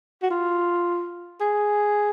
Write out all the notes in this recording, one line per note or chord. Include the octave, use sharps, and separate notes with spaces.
F#4
F4
G#4